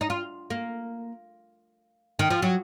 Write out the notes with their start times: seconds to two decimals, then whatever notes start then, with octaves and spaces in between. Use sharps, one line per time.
0.01 D#4
0.10 F4
0.50 A#3
2.19 D#3
2.30 F3
2.42 F#3